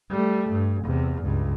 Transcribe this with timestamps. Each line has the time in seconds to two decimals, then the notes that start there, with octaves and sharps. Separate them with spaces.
0.11 G3 A3
0.51 G2
0.85 E2 C3
1.22 C#2 G2